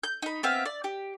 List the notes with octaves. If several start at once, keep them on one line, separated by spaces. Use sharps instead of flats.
G6
D#4 B5
B3 C4 E5 F5
D5
G4